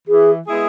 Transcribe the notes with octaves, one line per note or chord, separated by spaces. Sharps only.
E3 G#4
G#3 B3 E4 G#4